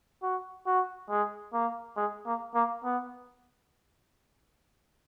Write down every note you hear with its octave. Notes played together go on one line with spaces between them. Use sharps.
F#4
F#4
G#3
A#3
G#3
A#3
A#3
B3